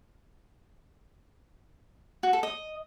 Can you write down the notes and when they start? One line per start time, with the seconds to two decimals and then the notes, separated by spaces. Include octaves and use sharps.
2.23 F#4
2.33 A4
2.43 D#5